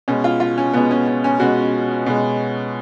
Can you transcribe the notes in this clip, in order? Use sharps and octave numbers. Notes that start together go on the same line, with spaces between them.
B2 G#3 C#4
F4
F4
C#4
B2 G#3 B3
C#4
C#4
C#4
B2 G#3 F#4
B2 G#3